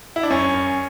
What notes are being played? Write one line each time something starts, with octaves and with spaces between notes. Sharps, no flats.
E4
D4
F#2 C#4
F#2